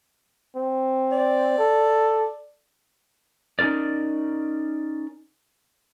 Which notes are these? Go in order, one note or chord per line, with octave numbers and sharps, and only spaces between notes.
C4
D5
A4
C#4 D#4 E4 A#4 D5